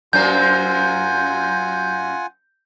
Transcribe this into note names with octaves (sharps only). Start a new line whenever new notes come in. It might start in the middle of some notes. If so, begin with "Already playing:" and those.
F#2 A#3 F4 C5 F#5 G#5 G6